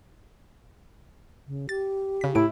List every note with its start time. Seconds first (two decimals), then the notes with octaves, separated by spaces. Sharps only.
1.47 C#3
1.69 G4 A6
2.21 C#3 B6
2.35 A2 A3 E4 D7